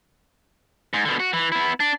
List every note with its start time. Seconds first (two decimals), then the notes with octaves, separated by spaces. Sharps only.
0.93 G#2
1.05 B2 D3
1.20 F#4
1.33 E3
1.52 B3 E4
1.80 D4